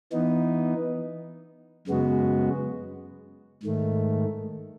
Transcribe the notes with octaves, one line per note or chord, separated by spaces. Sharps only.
E3 B3 D#4
F#2 C#3 G#3 B3 F#4
G#2 D#3 A3